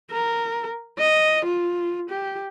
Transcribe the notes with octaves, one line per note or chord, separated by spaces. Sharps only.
A#4
D#5
F4
G4